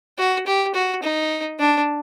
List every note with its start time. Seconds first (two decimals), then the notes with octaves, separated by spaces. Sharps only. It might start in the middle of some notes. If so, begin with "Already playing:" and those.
0.18 F#4
0.46 G4
0.74 F#4
1.03 D#4
1.59 D4